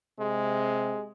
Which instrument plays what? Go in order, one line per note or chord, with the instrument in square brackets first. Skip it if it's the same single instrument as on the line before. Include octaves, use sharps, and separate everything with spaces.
[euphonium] C3 [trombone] G#3